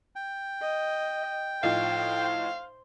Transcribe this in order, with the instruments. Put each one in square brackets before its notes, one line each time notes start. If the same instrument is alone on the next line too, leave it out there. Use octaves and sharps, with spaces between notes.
[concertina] G5
[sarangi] D#5
[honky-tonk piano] A2 F3 D#4 [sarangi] C5 [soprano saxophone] F5